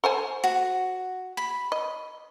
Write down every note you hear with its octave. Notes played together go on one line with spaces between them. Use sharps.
A4 C5 G#5
F#4
B5
D#5